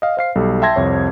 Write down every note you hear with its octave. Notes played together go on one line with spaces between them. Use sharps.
D#5 F5
C5 F5 C7
B1 G3 A4
E5 G5 A5 C6 G#6 A#6
C2 F2 C#5